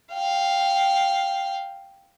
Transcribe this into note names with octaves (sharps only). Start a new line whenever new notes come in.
F5 G5